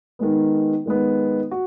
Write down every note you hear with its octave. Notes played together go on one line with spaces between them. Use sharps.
D#3 G#3 B3
D#3 G#3 B3
F#4